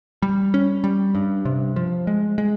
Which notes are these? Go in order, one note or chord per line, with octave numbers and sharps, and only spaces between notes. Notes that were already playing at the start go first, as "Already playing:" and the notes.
G3
C#4
G3
G2
C3
F3
G#3
G#3